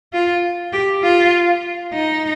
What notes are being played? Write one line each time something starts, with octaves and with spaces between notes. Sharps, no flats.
F4
G4
F4
D#4